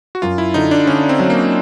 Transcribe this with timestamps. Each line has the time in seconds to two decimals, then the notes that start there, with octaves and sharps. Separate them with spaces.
0.15 F#4
0.22 F#2 F4
0.38 E4
0.54 D3 D#4
0.71 D4
0.87 D3 C#4
1.09 C4
1.19 F#3
1.30 A#3